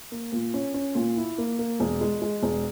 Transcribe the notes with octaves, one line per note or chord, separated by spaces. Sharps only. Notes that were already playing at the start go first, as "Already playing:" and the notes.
A#3
A#2
C#4
C#4
A#2
E4
A#3
A#3
E1
G#3
G#3
E1